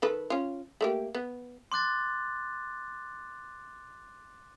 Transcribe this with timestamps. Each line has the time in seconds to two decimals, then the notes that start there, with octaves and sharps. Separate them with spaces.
0.02 D#3 A4 B4
0.30 C#4 F4
0.81 A3 A#3 G4
1.15 B3
1.72 C6 D6 F#6 A6